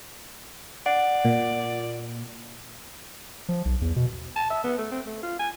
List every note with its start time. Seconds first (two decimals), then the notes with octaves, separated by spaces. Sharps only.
0.86 D5 F#5
1.25 A#2
3.49 F3
3.65 B1
3.81 E2
3.96 B2
4.36 A5
4.50 E5
4.64 B3
4.78 A3
4.91 C4
5.06 A3
5.23 F4
5.39 G#5